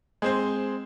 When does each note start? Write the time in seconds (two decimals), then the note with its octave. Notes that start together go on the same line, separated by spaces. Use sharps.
0.22 G#3 C4 C5